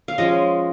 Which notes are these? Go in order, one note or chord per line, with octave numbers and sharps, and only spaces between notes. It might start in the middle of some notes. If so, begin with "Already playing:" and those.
F5
F3 G#3 C#4 D#5